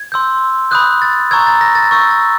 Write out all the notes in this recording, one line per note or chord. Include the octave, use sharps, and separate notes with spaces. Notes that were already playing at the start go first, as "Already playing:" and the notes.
Already playing: G#6
C6 E6 G6
B5 D#6 F#6 G6
A6
A#5 C#6 E6 G6 G#6
A6
A#6
A6
C#6 E6 G6 A6
A6